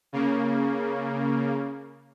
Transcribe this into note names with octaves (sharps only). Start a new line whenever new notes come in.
C#3 A#3